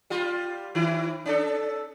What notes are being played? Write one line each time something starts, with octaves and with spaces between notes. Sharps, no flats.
G3 F4
D#3 E4
C#4 D4 A4